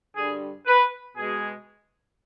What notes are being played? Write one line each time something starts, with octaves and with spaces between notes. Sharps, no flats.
G2 D3 G3 G#4
B4
B2 G#3 G#4